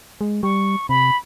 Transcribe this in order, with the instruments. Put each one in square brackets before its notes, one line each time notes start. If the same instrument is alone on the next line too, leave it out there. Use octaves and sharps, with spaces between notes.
[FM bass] G#3
[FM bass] G3 [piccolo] C#6
[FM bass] C3 [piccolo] B5